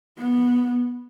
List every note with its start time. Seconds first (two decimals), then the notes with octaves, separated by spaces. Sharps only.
0.19 B3